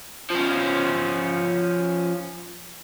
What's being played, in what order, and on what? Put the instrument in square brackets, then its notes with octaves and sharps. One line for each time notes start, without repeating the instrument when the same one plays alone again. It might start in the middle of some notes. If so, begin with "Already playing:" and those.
[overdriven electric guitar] F3 C#4